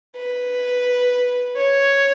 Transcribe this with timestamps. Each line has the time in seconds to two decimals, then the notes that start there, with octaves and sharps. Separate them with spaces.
0.16 B4
1.57 C#5